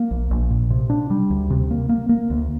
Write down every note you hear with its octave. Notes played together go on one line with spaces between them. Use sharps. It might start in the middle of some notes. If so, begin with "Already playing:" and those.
Already playing: A#3
A#1
A#1
A#2
C3
D4
G3
D2
C3
A#3
A#3
A#3
D2